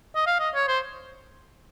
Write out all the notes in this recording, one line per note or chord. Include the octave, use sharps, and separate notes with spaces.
D#5
F5
D#5
C#5
C5